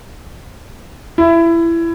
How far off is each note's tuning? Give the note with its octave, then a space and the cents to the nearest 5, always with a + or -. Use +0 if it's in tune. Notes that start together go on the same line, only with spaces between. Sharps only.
E4 +20